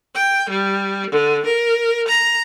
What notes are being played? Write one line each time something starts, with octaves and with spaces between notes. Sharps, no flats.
G5
G3
D3
A#4
A#5